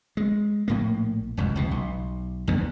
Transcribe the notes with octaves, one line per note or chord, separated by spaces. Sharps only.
G#3
A#1 A2 A#3
F1 C#2 F#2
E1 C#2 B2
B1
E2 G2 C#3 B3